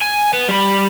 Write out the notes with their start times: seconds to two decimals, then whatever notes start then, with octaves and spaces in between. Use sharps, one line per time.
0.02 G#5
0.33 B3
0.48 G3 B5